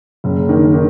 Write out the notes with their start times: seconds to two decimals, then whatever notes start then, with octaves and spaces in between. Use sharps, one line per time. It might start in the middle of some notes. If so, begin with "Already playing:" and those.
0.24 F#1
0.49 D#3
0.74 D#3